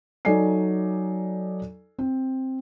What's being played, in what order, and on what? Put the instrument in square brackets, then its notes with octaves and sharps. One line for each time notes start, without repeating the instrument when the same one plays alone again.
[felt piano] F#3 D#4 A4 D5 G#5 C7
C4